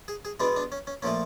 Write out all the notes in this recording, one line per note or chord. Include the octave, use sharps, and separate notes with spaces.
G#4
G#4
B2 G#3 B3 D4
D4
C#4
C#4
A#2 F3 A3 C#4